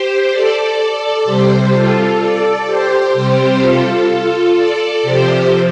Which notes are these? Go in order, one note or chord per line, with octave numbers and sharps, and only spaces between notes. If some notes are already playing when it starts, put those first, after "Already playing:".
Already playing: G4 C5
A4 D5
C3 G3 G4 C5
F4 A4
A4 D5
G4 C5
C3 G3 G4 C5
F4 A4
F4 A4
A4 D5
C3 F3 G4 C5